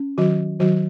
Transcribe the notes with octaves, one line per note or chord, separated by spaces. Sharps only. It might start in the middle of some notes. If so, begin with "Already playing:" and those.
Already playing: C#4
D#3 F#3 F#4
D#3 F#3 F#4